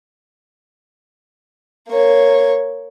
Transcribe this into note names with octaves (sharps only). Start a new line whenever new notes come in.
A#3 C#5